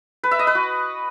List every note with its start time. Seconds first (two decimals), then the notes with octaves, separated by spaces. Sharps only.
0.24 B4
0.31 E5
0.39 D#5
0.47 B4
0.55 F#4